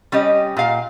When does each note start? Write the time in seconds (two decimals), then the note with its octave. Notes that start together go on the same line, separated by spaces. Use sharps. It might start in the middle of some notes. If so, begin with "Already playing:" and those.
0.12 G3 C#4 G4 D#5
0.57 A#2 F5